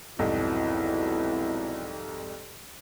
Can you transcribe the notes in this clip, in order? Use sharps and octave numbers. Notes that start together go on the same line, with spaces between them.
C2 F2 G#2 B2 F#3 E4